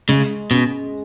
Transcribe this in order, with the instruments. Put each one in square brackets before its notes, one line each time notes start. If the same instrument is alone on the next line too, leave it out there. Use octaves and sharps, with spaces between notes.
[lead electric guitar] C#3 [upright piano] G#3
[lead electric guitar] B2 [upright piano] C#4